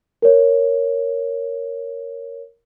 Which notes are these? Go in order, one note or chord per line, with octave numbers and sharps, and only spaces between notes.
A#4 C#5